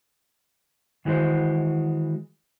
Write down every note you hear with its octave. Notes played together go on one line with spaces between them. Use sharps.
D#3 E3 G#3 F#4 C5